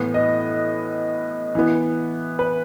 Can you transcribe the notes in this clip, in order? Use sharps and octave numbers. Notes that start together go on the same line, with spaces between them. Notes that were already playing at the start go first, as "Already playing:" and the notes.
Already playing: A2 E3 B3
D#5
E3 B3
B4